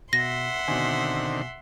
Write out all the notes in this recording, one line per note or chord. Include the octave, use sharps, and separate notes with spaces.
B2 E5 F#5 C6 A#6
B2 D3 D#3 C4 G#5